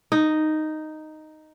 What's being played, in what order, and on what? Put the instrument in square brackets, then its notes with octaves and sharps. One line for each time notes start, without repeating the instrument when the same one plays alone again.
[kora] D#4